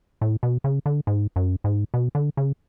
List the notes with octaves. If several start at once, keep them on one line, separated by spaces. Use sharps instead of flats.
A2
B2
C#3
D3
G#2
F#2
G#2
B2
D3
C#3